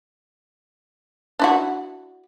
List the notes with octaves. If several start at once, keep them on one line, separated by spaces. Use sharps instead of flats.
D4 E4 F#4